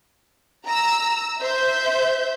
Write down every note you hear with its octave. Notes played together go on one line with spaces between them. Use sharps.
A#5 E6
C5 E5 G6